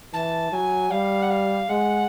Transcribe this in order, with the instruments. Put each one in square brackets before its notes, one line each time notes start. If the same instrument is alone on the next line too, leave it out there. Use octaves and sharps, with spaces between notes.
[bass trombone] E3 [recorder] A5
[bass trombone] F#3 [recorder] G#5
[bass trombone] G3 [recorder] F5
[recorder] F#5
F5
[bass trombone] G#3 [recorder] F#5